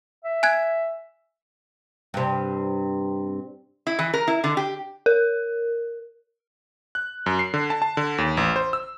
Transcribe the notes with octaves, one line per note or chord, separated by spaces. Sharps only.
E5
G#5 F#6 G#6
G2 C3
E4
E3
A#4
E4
D3
G4
A#4
F#6
F#2
C7
D3
A5
A5
D3
D#2
A1
C5
E6